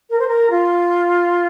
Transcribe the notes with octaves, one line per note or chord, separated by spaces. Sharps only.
A#4
C5
A#4
F4